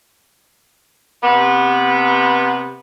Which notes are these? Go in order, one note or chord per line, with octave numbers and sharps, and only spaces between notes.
C3 B3